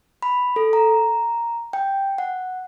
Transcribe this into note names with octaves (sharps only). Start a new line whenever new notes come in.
B5
A4
A#5
G5
F#5